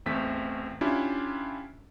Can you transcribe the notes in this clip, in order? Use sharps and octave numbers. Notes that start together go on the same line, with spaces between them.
A1 E2 A3 C4 B6
C#4 D4 E4 F4 G4